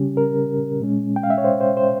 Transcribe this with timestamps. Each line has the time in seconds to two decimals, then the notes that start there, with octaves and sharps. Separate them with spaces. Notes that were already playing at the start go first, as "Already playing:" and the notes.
Already playing: C#3 G3 C#4 G4
0.17 A#4
0.80 A#2 G#3 C#4
1.16 G5
1.23 F5
1.30 E5
1.38 C#5
1.44 C5
1.61 C5
1.77 C5